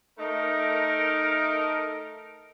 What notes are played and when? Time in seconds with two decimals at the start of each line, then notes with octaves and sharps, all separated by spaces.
0.19 A3 D#4 A#4